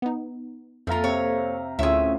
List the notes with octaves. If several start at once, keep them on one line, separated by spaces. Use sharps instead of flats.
B3 D#4
F2 F3 A#3 F4 A4 E5 F5 A#5
C3 C#5
D2 A2 A3 C#4 F4 G#4 E5